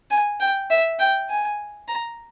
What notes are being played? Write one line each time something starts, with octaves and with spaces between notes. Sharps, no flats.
G#5
G5
E5
G5
G#5
A#5